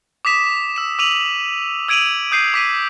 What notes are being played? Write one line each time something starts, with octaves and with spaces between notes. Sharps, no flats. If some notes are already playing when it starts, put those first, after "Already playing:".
D6 D#6 B6 E7
E6 E7
D6 E6 D#7 F7 F#7
E6 G#6 D7 D#7 F7 F#7
D#6 G6 C7 D#7
D6 B6 D#7